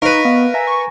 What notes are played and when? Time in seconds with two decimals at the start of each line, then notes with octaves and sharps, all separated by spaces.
0.02 D#4 A#4 B4 D#5 F5 C#6
0.25 B3 F5
0.54 E5 G#5 A#5 A#6
0.67 C#6